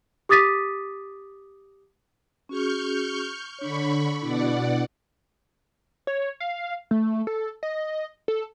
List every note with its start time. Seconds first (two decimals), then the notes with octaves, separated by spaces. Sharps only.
0.29 G4 D6 D#6 A6 B6 D#7
2.49 C#4 F#4 G#4 C#6 F6 G6
3.59 D3 D4 C#5 B5 C#6
4.22 B2 D4 E4 D5 F#5
6.07 C#5
6.40 F5
6.91 A3
7.27 A4
7.63 D#5
8.28 A4